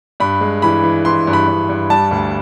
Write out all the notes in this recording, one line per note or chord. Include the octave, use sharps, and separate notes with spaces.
G2 B5
G#3
E3 B5
E3
E3 C6
G2
B5
G2
G2
G3 A5
D2